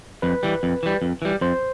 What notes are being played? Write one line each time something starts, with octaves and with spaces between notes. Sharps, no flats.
F2 B4
E3 G3
F2
E3 G3
F2
E3 G3
F2 C5